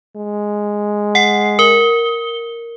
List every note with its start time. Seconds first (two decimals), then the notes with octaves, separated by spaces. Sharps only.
0.16 G#3
1.15 F#5 C7
1.59 A#4 G7